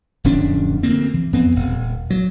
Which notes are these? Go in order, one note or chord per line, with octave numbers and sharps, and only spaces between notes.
D1 F2 C#4 D4
D2 G3 A#3 C4
E3
F2 B3 C4
D#1
F#3